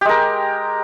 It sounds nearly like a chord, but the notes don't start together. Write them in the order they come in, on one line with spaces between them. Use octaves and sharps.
G4 G#3 A#4